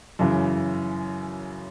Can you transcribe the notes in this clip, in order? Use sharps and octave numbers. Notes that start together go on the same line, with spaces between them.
F#2 C#3 E3